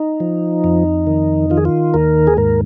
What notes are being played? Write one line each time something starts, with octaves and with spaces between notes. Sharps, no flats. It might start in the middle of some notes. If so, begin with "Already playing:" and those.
Already playing: D#4
F3
F2
D#3
D#3 F4
G#4
F4
D#2 A#4
G#4
G#2 A#4